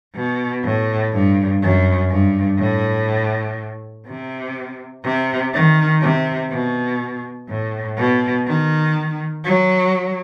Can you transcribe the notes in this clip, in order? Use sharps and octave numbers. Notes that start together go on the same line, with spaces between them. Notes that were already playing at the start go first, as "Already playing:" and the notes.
B2
A2
G2
F#2
G2
A2
C3
C3
D#3
C3
B2
A2
B2
D#3
F#3